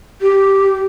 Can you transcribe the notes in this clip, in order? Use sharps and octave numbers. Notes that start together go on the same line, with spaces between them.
G4